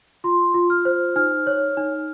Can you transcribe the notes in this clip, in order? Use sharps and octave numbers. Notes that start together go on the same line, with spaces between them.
F4 C6
F4
F6
C5
D#4 F6
C#5
D#4